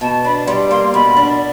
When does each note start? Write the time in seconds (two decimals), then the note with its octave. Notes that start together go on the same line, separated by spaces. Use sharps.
0.01 B2 A5
0.24 D4 B5
0.47 G3 C6
0.71 A#3 C6
0.94 B2 B5
1.17 D4